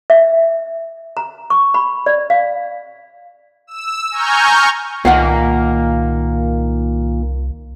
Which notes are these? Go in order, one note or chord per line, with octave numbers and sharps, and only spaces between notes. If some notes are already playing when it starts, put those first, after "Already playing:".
E5
A#5
C#6
B5
D5
F5
E6
G#5 A#5 C#6 F6 G6
C2 A#2 D#3 A#3 F5 F#5